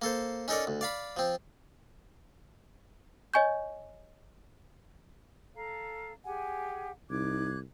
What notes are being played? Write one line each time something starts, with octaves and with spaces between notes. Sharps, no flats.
A#3 A4 C5
C#4 D#4 A4 A#4 D5
D2
D5 F5 B5
F3 C4
C#5 D#5 G#5 C#6 G6
A4 F5 A#5
G4 G#4 F#5 G#5
C2 D#4 D6 F#6 G#6